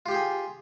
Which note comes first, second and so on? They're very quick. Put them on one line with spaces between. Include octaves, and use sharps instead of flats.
F4 G4 G5 G#4